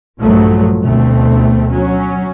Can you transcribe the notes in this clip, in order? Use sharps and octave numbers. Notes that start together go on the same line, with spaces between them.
A#1 G2 F3 F#3 A3
D2 B2 A3 C4
F#3 C#4